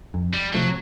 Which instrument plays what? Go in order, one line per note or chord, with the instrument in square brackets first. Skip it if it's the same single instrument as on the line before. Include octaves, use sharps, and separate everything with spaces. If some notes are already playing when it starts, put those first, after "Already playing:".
[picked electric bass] F2
[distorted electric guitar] G3
[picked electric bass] C3 F3 A3 [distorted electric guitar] F#3